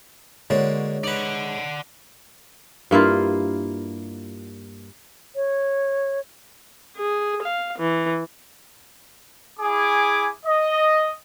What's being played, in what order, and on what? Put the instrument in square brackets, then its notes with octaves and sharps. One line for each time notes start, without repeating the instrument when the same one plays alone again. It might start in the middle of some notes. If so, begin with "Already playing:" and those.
[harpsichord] D3 A#3 F#4 [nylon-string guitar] G#3 [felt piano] C#5
[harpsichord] D#4 B4 [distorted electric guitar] D5 F#5
[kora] G2 A#3 E4 F4
[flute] C#5
[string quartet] G#4
F5
E3
[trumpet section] E4 G#4 G#5 D6
D#5